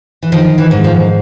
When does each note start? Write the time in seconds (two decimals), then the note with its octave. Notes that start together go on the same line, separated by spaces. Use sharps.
0.22 E3
0.32 D#3 F3
0.58 E3
0.71 G#2
0.84 F3